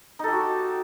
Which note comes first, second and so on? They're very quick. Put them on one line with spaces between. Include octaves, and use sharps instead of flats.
D#4 A4 G4 F#4